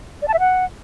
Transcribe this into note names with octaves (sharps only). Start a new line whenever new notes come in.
D5
A5
E5
F#5